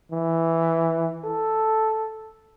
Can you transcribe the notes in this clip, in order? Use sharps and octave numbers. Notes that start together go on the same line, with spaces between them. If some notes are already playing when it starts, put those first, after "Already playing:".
E3
A4